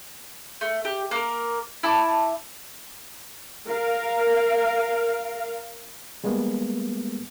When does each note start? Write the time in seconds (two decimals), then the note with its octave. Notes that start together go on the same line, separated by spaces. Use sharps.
0.61 A3
0.85 G4
1.11 A#3 A#4
1.83 E4 A5 D6
3.68 A#4 F5
6.24 G3 G#3 A#3 B3